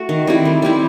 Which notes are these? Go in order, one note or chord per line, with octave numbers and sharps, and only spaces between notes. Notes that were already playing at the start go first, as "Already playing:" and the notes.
Already playing: A3 F#4
D#3
G3 C4 E4
D#3
G3 C4 E4